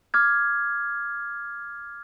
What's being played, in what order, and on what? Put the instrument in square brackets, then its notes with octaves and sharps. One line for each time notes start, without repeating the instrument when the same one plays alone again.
[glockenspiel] D6 F6 G#6